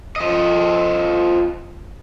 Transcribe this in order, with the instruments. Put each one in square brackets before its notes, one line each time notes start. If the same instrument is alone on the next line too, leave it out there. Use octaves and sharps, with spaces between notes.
[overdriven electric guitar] F3 D#5